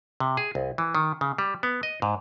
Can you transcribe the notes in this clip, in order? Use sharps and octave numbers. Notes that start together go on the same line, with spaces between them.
C3
G#4
C2
E3
D#3
C#3
G3
B3
D#5
G#2